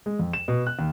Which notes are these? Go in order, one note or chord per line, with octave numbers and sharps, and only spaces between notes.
G#3
F2
E7
B2
F#6
D#2